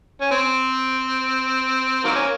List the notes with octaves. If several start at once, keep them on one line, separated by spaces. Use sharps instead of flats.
C#4
C4
D#3 F#3 A#3
C#4